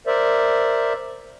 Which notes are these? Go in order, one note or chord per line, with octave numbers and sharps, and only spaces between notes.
A#4 C5 D5 E5